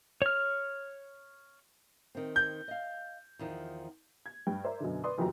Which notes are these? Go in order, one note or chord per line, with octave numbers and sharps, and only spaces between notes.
C#5 F6
D#3 C4
G6
D#5 F5
E2 D#3 F3
G#6
G2 G5
A#4 C5 D5 E5
F#2 B2 D3
B4 D5 C6 D#6
F#1 F2 E3 F#3 G4 A#5